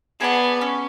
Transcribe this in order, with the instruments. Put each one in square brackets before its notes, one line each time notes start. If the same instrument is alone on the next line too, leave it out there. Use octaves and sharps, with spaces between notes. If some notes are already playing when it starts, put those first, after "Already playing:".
[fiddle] B3 [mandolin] G#4 D5 A5
[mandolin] C#4